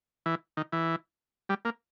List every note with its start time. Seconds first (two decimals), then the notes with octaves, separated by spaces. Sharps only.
0.26 E3
0.57 D#3
0.72 E3
1.49 G3
1.65 A#3